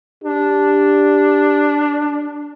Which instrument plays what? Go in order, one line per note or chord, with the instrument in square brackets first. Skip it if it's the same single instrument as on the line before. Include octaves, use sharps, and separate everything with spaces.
[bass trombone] D4 [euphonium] G4